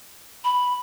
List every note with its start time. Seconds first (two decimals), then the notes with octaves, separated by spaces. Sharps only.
0.44 B5